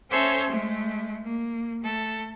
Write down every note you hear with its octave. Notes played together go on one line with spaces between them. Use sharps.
C#4 A4 C5 C#5 E5 G#5
G#3 A3
A#3
A3 A4